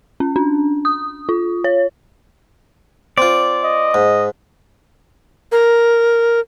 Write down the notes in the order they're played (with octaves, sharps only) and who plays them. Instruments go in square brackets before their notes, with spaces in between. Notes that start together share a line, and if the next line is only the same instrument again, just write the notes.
[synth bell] C#4
D4
D#6
F4
C#5
[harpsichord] C4 F4 [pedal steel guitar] D5
[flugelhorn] D#5
[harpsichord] G#2
[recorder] A#4